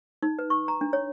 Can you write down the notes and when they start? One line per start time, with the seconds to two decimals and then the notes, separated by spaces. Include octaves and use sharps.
0.23 D#4
0.39 B4
0.50 C#6
0.68 A#5
0.81 D4
0.93 C#5